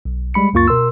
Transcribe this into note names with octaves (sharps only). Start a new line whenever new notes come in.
B1
G3 G#3 B5 C#7
C#2 F#2 A#3 F4 C#6 A6
B2 A#4 C6 E6